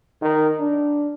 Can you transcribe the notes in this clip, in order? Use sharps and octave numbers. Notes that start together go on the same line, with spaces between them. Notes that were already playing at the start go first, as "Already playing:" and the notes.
D#3
D4